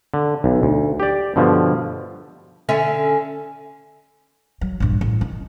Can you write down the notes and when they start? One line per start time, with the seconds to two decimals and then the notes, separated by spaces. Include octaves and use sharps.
0.14 D3
0.44 B1
0.63 D2
1.00 G4 D5
1.36 G2 B2 D3 F3
2.69 D3 C#4 E5
4.61 F#3
4.80 A#1 G2
5.01 A1
5.21 D#3